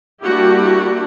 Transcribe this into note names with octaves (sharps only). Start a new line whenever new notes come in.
G3 A#3 D4 E4 F#4 G4